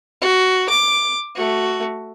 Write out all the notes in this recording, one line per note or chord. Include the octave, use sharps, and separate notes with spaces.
F#4
D6
A3 F#4